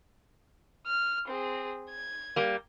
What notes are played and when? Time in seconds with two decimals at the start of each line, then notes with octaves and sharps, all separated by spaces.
0.86 F6
1.27 C4 G#4
1.90 G#6
2.36 G3 A#3